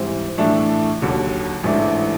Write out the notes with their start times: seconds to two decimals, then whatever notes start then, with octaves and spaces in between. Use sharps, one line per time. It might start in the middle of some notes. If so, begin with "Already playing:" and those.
Already playing: G#2 E3 G3 C4
0.38 A2 E3 A3 D4
1.01 D#2 D3 F#3
1.63 A1 G#2 E3 A3 D4